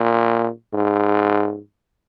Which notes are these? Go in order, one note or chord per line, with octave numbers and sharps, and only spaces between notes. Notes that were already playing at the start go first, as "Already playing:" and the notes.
Already playing: A#2
G#2